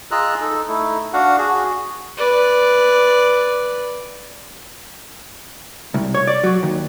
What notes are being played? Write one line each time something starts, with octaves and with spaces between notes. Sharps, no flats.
F4 G#4 D#5 A#5 E6 F#6
D#4 A4
A3 D#4 E4
D4 F#4 F5 F#5
F#4 G#4
B4 D5
C2
C#5
D5
F#3
D#2